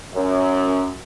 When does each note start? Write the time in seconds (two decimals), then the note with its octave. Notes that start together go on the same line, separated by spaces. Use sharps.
0.13 F#2